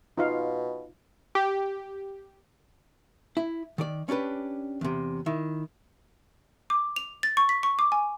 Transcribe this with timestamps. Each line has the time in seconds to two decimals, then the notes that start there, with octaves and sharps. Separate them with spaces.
0.17 B2 D#4 F4 F5
1.35 G4
3.37 E4
3.78 D#3 D5
4.09 C#4 D4 G4 B4
4.81 E2 C3
5.26 D#3 E4
6.70 D6
6.96 F7
7.23 A6
7.37 C#6
7.49 B6
7.63 C#6
7.79 D6
7.92 G#5